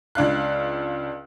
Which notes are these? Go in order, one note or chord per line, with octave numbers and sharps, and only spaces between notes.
C#2 D4 F5 F#6